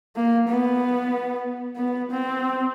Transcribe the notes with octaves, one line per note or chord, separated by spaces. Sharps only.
A#3
B3
B3
C4